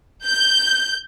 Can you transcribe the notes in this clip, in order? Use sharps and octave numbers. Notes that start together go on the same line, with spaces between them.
G6